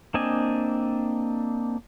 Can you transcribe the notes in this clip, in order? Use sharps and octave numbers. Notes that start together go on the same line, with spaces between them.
A#3 C4 D4 D#5 G#5